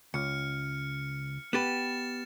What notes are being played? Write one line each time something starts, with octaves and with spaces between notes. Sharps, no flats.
C#2 F6 C#7
B3 G4 B4 A6 E7